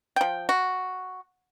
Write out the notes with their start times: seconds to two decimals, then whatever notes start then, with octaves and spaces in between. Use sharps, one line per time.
0.16 F3 G5
0.49 F#4